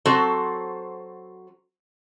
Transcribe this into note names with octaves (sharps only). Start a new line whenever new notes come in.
F#3 C4 F#4 A4 C5